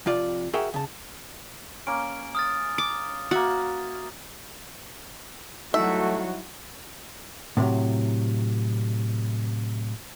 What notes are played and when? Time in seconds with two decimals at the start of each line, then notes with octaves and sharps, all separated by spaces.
0.06 F2 C3 F4 D5
0.54 F#4 G#4 A#4 E5 F#5 G5
0.74 C#3 A5
1.87 A#3 C#4 D7
2.35 D#6 F6 A6
2.78 D6
3.31 A#3 F#4 E5 A6
5.74 F#3 G3 A3 D#4 E4 F#4 E5
7.57 A2 C3 E3 F#3